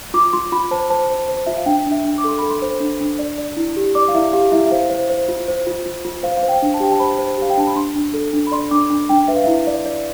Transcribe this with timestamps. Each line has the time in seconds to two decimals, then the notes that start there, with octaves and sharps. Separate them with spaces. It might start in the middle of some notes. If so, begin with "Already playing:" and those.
0.14 F4 D6
0.33 F4 C6
0.52 F4 B5
0.71 C5 A5
0.90 C5 A5
1.10 C5
1.29 C5
1.46 F4 E5
1.57 F5
1.66 D4 G5
1.86 D4
1.92 E5
2.04 D4
2.18 D6
2.24 A4 C6
2.39 A4 B5
2.50 C6
2.62 C5
2.80 D4
3.00 D4
3.19 D5
3.38 D5
3.57 E4
3.76 G4
3.95 D5 D6
4.08 F5
4.14 E4 E5
4.33 G4 F5
4.52 E4 E5
4.67 E5
4.71 C5 F5
4.90 C5
5.09 C5
5.28 F4
5.48 C5
5.67 F4
5.86 F4
6.05 F4
6.23 C5 F5
6.37 F5
6.43 C5
6.49 G5
6.62 D4
6.74 A5
6.80 G4 G5
6.92 A5
7.00 C5 B5
7.18 C5
7.37 G4 F5
7.50 G5
7.58 D4 A5
7.67 B5
7.75 D4 C6
7.95 D4
8.14 A4
8.33 D4
8.47 B5
8.52 D5 C6
8.71 D4 D6
8.90 D4
9.09 D4 G5
9.28 B4 E5
9.36 F5
9.44 E4 E5
9.67 D5
9.86 D5